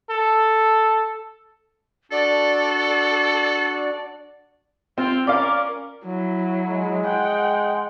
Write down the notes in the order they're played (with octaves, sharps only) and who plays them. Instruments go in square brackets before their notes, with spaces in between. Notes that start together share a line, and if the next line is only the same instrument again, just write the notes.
[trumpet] A4
[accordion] D4 F#4 [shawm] A4 [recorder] D5
[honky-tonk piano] C4 [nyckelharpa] F4 G5
[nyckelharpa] C#4 A#4 [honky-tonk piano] D5 F5
[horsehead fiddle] F#3 E4
[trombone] G#3
[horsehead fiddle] F#5 G5